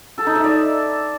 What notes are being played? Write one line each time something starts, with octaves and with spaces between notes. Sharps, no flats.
A4
D#4
E5
D5